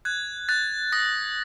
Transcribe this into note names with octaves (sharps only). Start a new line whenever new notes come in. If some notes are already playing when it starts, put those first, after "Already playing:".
F#6 G#6
F#6 A6
D#6 A#6